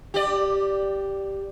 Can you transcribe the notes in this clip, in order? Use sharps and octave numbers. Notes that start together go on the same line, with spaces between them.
G4 D5